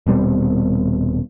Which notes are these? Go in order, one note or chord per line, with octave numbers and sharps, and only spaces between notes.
D#1 B2 G3 C4